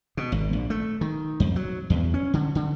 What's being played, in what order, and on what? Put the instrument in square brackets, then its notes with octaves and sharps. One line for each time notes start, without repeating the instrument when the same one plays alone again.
[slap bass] B2
G#1
A#1
A3
D#3
F2
F#3
E2
C#4
D3
D3